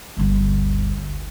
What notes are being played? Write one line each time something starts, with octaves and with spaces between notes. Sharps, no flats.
G1 D2